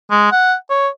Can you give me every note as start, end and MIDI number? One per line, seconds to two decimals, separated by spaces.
0.11 0.30 56
0.32 0.55 78
0.70 0.88 73